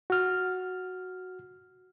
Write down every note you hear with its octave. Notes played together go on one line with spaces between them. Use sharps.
F#4 F6